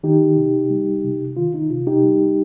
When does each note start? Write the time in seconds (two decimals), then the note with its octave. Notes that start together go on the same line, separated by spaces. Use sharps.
0.03 D#3 D#4 G4
0.37 C3
0.70 G3
1.04 C3
1.37 D#3 F4
1.54 D#4
1.70 C3 F4
1.87 D#4 G4
2.03 G3